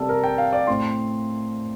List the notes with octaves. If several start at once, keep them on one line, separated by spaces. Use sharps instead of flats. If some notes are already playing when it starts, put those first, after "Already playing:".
Already playing: C3 G3 A#3 A4
A#4
G5
F5
D5
A2 A3 C4 C6